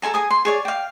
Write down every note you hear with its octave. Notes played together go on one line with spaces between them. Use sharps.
A4 C5 G#5 A#5
G#4 G#5 D#6
C6
G#4 C#5 D5
F5 G5